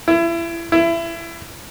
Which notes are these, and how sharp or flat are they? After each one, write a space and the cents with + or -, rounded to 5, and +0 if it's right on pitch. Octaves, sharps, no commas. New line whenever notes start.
E4 +30
E4 +25